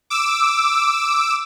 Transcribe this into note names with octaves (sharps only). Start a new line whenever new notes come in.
D6 E6